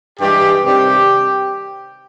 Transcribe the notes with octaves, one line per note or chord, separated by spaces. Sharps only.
G2 E3 G#3 G4
C3 D#3 G3 G4